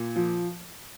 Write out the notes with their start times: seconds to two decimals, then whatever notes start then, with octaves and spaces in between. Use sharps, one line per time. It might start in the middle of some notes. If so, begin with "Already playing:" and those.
Already playing: A#2
0.16 F3